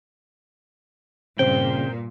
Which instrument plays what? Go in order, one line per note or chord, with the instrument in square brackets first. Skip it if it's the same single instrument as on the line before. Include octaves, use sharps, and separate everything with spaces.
[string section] G2 A#2 [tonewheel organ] C#3 [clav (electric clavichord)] C4 [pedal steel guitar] G5